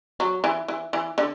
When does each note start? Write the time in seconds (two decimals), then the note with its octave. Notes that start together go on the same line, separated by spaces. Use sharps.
0.20 F#3
0.44 E3
0.68 E3
0.93 E3
1.18 D3